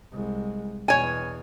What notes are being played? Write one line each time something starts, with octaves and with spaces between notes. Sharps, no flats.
C2 G#3
E2 B2 C#5 G#5